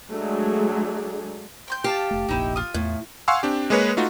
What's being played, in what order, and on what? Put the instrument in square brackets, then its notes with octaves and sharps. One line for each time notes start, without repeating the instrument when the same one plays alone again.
[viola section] F#3 G#3 A3 D4 G#4
[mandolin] G5 C6 G6
[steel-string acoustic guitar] G4 [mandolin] F5 A5
[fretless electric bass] F1 A3
[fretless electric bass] F1 A#1 A#3 [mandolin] D#4 E4 G5
[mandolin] F4 D#6
[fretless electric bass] E2 [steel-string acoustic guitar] A2
[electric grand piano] F5 F#5 G#5 C6 C#6 E6
C4 D4 G4
G#3 A#3 G#4 B4 C#5
A3 D#4 F4 F#4